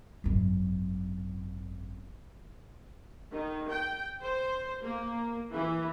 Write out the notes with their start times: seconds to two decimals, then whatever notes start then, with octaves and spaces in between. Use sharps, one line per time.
0.24 G#1 F#2
3.33 D#3
3.70 G5
4.21 C5
4.81 A#3
5.53 E3